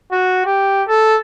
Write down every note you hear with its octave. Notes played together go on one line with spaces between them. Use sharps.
F#4
G4
A4